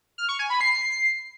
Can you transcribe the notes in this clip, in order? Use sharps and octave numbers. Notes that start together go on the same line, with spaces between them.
F6
C#6
G#5
B5
C7